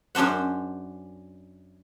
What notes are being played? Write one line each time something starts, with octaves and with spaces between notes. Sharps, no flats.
F#2 C#4 D4 C5 F#5